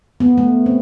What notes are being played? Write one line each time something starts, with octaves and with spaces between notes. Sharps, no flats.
B3
A3
C4